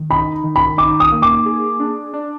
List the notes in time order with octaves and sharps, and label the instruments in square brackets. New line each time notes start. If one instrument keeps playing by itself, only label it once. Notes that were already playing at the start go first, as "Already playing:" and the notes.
Already playing: [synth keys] D#3
[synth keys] D#4 [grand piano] B5
[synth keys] D#3
[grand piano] B5
[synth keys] D#4 [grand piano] D6
[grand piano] D#6
[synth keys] A#3
[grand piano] D6
[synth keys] G#4
D4
D4